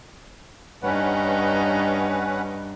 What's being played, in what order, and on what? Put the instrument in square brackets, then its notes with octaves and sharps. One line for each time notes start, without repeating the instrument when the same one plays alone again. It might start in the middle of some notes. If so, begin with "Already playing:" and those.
[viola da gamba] G2 D#4 [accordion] C#4 B4 F#5